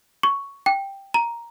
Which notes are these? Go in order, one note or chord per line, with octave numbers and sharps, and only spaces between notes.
C#6
G5
A#5